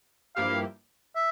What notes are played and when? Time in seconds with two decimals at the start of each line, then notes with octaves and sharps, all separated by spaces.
0.36 G2 F3 A#3 E4 G4 F5
1.16 E5